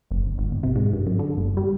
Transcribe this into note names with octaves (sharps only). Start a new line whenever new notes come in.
F#1
G1
G#1
G1
C3
G#2
G2
F#2
D3
G1
G3